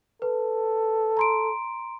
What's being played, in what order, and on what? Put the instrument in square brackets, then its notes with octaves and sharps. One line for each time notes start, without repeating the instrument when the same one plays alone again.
[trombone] A4 [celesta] B4
[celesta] A#5 C6 D7